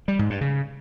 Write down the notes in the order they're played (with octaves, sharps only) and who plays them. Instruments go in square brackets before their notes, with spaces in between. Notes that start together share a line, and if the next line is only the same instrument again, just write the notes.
[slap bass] G3
G#2
G2
C#3